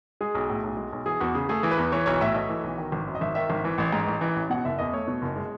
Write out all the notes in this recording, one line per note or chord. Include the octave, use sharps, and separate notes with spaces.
G#3 G#4
B1
A2
B1
G#3
B1
E3 G#4
E2 F#4
C#3 G#4
A3 G#4
E3
B4
E2
E3 C#5
B1 C#5
A2 E5
A3 D#5
E3
B1
D#3
G#1
F#2
D#5
G#1 E5
D#3 E5
G#1
E3
A1
G#2
A1
E3
A1
B2 F#5
F#1 E5
E2 D#5
A3 C#5
B2
F#1
G#3